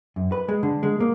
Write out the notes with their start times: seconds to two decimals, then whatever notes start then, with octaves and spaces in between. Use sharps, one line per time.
0.16 F#2
0.32 B4
0.48 G#3
0.63 D3
0.83 G#3
1.00 A#3